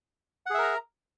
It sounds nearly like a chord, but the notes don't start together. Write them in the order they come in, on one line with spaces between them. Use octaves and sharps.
F#5 G#4 E5 A#4 A#5